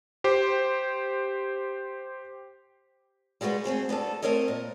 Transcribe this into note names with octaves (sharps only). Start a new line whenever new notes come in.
G4 C5
G3 G#3 F#4 G4 B4
A3 C4 G#4 C5
B3 D4 F#4 A4
A3 C4 D4 A#4 C#5 D#5
A#2